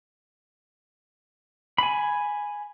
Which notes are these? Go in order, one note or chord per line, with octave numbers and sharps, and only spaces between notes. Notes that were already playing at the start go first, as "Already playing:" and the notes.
G#5 B5